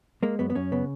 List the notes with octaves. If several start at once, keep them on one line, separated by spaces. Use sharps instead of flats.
G#3 A#3
F#2 B3
B3
F#2 C#4
C#3 B3